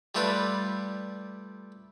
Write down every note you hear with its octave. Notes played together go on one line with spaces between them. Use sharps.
G3 A3 F4 G4 B4 D5